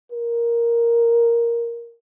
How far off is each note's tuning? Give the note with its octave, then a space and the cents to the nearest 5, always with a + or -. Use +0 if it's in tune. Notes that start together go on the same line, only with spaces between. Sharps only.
A#4 +5